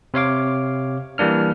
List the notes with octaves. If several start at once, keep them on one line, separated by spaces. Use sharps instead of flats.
C3 C#5 F5 D6
E3 G3 A#3 D4 F6